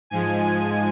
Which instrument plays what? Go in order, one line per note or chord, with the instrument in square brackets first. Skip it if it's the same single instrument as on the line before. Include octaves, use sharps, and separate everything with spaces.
[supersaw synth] G#2 F3 G#3 G#5